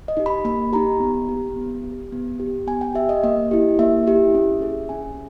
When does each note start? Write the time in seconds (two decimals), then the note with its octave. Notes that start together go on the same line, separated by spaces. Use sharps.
0.08 D#5
0.17 D#4 G4
0.26 B5
0.45 A#3 B5
0.73 D#4 G4 A#5
1.00 B3
1.29 G4
1.56 B3
1.84 G4
2.12 B3
2.40 G4
2.67 B3 G#5
2.81 G5
2.94 G4 E5
3.09 D#5
3.23 A#3 D#5
3.51 E4 G4
3.79 A#3 E5
4.07 E4 G4
4.35 C#4
4.62 G#4
4.89 C#4 G#5